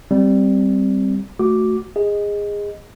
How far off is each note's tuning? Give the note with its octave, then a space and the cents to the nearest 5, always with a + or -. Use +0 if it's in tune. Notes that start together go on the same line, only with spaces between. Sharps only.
G3 +0 C4 +0
A3 +0 F#4 +0 D6 +0
G#4 -20 D#5 +0